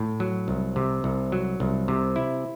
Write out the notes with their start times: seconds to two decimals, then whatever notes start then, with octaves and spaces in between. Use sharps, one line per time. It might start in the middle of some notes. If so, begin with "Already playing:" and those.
Already playing: A2
0.20 F#3
0.48 C2
0.76 C3
1.04 C2
1.32 F#3
1.60 C2
1.88 C3
2.16 E4